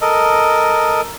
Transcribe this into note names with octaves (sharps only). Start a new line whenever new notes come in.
A4 A#4 D#5